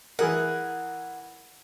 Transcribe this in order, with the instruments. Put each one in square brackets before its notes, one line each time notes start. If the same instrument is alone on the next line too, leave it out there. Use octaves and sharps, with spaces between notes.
[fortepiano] E3 G#4 A#4 [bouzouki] F#5